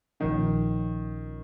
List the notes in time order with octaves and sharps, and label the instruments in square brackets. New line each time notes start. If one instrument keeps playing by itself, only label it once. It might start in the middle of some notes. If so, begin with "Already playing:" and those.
[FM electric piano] A#1 A#2 F3 C#4 [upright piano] D#3